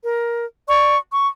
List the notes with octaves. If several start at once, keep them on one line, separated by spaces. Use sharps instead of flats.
A#4
D5 C#6
C#6